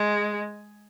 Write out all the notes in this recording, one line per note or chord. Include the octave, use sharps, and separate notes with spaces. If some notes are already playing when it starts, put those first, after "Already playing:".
Already playing: G#3